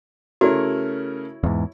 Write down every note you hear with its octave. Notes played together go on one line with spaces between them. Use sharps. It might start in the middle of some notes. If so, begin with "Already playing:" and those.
C#3 A3 E4 F#4 A#4 C#5
E2 G#2